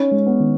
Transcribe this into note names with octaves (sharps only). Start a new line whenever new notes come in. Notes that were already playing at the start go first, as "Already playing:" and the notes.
Already playing: C#4 D#4
G#3
B3
D#3